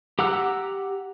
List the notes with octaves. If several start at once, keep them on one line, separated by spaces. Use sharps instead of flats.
G4 F#5 A#5 E6 F#6